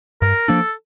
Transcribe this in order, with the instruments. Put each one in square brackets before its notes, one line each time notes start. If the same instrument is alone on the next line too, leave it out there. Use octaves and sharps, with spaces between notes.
[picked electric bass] G2 [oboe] A#4
[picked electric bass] F3 A#3 D4 [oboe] A4